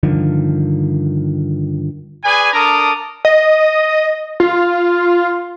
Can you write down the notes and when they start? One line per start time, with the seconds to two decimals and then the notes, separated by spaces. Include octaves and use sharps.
0.03 G2 D3 D#3 F3
2.24 G#4 B4 D5 G#5
2.53 D4 A4 A#4 A#5 D6 D#6
3.25 D#5
4.40 F4